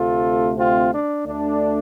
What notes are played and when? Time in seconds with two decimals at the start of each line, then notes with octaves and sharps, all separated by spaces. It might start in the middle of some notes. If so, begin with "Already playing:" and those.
Already playing: D2 C3 A3 C4 F4 A4
0.57 C4 F4
0.91 D4
1.26 D2 D3 A3 D4